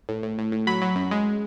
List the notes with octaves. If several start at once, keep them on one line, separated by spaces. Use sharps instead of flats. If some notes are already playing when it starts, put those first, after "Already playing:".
A2
A2
A2
A2
F#3 B5
F#3
F#2
G#3